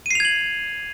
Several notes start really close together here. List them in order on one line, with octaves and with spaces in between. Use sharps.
D#7 C7 F7 G#6 F#7